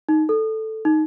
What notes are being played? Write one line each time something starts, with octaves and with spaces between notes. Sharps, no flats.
D#4
A4
D#4